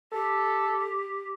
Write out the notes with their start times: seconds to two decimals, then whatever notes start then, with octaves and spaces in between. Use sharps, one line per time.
0.12 G4 A4